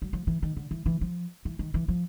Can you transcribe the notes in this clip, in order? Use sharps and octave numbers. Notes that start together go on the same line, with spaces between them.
F#3
F3
E3
D#3
D3
E3
E3
F3
E3
D#3
E3
F3